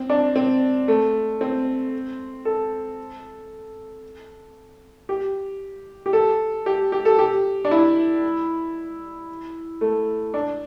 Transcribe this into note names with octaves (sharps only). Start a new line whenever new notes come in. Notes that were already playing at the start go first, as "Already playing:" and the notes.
Already playing: C4
D4
C4
A3
C4
A4
G4
G4
A4
G4
G4
A4
G4
D4
E4
A3
D4